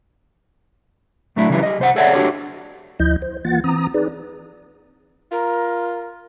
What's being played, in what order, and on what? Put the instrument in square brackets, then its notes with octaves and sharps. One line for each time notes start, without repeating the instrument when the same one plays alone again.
[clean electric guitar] A2 F#3 A3 D4 E4
C#3 E3 F#3 G3 E4 B4
G3 D#5
C2 C5 F#5
G#4 A4 C#5 D5 E5 F#5
D4 F#4 G4 A4 C#5
[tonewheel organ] D2 F3 E4 D#5 G6
C5
E3 A#3 F4 F#5 A6
E3 C4 A#5 D#6
D#4 G#4 B4 D5
[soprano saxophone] F4 [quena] A#4